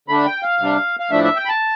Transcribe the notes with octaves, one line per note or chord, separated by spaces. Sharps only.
D3 A3 D4 B5
G5
F5
C3 G3 D4
F5
A2 F3 A3 D4 E5
E5
G5
B5
A5